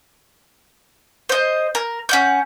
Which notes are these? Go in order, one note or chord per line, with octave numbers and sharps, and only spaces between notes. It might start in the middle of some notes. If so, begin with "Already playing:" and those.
C5 D#5
A#4
C#4 F#5 G6